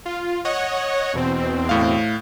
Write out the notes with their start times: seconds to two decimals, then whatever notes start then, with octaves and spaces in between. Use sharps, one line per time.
0.06 F4
0.45 C#5 D#5 F#5
1.14 E2 B2 C4
1.69 A2 F5